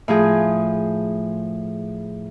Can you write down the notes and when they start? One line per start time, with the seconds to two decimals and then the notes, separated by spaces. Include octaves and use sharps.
0.08 A2 F3 G#4